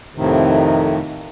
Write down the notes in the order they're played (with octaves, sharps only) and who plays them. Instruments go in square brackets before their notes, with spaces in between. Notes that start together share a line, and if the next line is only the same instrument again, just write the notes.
[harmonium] F2 A2 C3 D#3